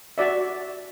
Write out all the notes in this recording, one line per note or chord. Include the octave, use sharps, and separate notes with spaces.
F#4 D5 E5